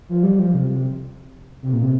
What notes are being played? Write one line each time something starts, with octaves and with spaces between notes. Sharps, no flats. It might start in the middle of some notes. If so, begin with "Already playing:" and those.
F3
G3
F3
C3
C3
C3
A#2
C3